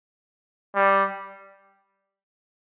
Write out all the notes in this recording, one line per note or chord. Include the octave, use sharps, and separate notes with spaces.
G3